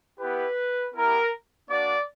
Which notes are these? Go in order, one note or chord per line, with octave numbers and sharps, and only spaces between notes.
B3 E4 G4 B4
B3 E4 G4 A#4
A#3 D4 F#4 D5